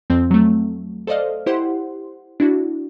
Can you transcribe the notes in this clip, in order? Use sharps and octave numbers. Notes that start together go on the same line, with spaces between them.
F2 F3 C4
F#3 A3
A4 C5 D5 D#5 F5 F6
E4 G4 C5 F#5 C6
D4 E4 F#4